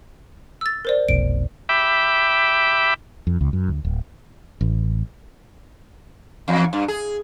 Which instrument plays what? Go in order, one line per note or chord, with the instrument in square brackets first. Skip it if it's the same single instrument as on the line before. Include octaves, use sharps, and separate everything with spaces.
[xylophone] E6 A6
A#4 C5 D5
[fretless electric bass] F1 B1 [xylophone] D7
[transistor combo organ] E5 G5 B5 D6
[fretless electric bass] F2
C#2
F#2
D2
D1
A1
[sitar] E2
G2
G#4